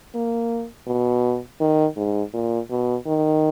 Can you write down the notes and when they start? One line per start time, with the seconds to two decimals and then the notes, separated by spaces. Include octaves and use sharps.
0.15 A#3
0.87 B2
1.60 D#3
1.97 G#2
2.34 A#2
2.70 B2
3.07 D#3